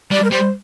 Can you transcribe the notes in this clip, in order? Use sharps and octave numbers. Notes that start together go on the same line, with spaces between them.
G3 D5
A#4
G3 C5